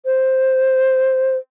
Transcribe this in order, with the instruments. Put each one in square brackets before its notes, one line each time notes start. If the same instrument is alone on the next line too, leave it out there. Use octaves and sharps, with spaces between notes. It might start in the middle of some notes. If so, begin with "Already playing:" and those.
[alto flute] C5